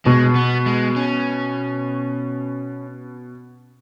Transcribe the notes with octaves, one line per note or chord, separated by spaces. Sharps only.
B2 G#3
B3
G#3
C#4